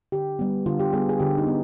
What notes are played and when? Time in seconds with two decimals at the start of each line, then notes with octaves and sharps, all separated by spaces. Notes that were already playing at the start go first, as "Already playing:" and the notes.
0.12 D3 G4
0.39 G3 B3
0.66 D3 F4
0.79 G4
0.93 G3 B3 G#4
1.09 G#4
1.19 D3 G4
1.38 D#4
1.47 B3